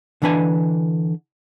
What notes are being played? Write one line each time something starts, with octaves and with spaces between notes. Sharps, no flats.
D3 E3 D4 B4 G#5